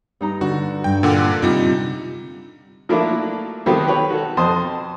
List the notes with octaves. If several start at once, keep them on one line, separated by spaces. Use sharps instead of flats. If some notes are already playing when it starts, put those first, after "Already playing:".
G2 D#4 A#5
D3 D4 F#4
G2 G5
A#2 D3 F#5 D6 F6
C3 G3 D#4 F4
F3 F#3 A3 A#3 D4 E4
D#3 F#3 G3 B3 C4 A4
G4 B4 C#5
F#4 A4
F2 C5 A5 C6 D#6